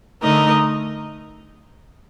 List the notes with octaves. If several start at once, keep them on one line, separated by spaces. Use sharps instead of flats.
D3 A3 D#4 A#4 D#5